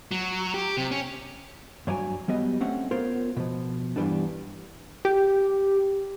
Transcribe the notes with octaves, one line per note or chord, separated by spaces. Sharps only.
F#3
G4
C3
C#4
G2 F#3 C#5 D5 G#5
F#3 G3 B3 D#5
A3 C4 C#4 F#5
B3 F4 A#4 C5 C#5
B2 F3
G2 E3 F3 G3 B3 D4
G4